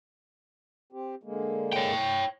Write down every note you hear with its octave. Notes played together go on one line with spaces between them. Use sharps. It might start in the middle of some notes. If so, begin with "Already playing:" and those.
C4 G4
D3 G#3 A#3
C#5 G5